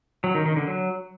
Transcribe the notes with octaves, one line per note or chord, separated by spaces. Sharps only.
F#3
D#3
D#3
D3
F#3